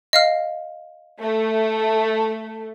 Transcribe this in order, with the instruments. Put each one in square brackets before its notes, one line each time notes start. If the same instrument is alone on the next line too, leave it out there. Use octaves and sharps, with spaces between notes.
[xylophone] D#5 F5 F6
[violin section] A3